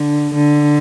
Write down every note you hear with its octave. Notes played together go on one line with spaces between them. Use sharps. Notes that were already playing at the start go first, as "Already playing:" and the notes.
Already playing: D3
D3